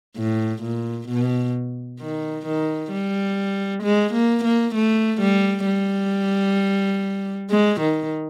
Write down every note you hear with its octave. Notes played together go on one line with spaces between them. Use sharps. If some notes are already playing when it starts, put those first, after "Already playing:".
A2
A#2
B2
D#3
D#3
G3
G#3
A#3
A#3
A3
G3
G3
G#3
D#3